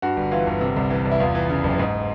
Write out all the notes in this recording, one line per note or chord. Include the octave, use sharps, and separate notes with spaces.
G2 F#4
G1
E3 F4
G1
C3
C2
E3
C2
E4
E2 F4
E3
C#3
F#1
G#2